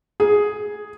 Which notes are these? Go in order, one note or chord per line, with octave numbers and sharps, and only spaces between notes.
G#4